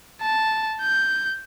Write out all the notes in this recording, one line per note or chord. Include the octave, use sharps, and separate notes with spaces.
A5
G6